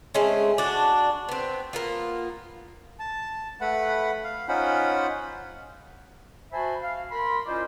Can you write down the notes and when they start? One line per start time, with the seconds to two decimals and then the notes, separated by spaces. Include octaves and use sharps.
0.14 G#3 A3 C4 C#4
0.58 D4 F#4
1.29 B3 C4
1.73 A#3 B3 F4
2.99 A5
3.61 A3 B4 F#5 B5
4.24 F5
4.48 C#4 D#4 F4 C5 F#5 B5
6.52 F#4 C5 E5 G#5 A5 B5
6.82 F5
7.11 A#4 B5 C6
7.46 C#4 E4 F4 C5 D5 D#5